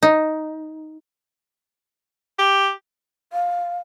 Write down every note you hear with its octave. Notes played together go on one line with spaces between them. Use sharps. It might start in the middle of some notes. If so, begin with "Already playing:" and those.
D#4
G4
F5